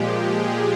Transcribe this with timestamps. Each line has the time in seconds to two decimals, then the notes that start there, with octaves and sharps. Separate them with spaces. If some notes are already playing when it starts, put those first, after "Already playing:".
Already playing: A#2 F3 G#3 G4
0.22 G#4